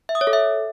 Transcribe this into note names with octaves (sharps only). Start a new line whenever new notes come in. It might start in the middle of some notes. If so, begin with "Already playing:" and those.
E5
D#6
C#5
A4
E5